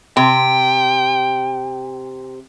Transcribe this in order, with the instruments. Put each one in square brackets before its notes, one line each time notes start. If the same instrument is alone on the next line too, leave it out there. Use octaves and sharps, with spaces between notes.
[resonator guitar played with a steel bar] C3 [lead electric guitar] G5